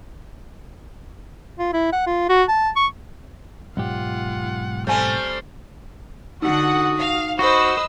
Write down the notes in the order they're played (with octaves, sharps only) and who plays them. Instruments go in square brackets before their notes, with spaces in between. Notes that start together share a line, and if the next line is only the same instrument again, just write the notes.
[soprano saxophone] F4
E4
F#5
F4
F#4
A5
C#6
[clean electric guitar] B1 G#2 G4 [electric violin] F4 F#5
[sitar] G3 A3 C4 [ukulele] C5 G#5 [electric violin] F6
[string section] D3 F#5 [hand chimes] D#4 [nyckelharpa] F#4 D#6
[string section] F5
[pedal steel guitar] F#4 [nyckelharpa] B4 D#5 [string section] C5 E6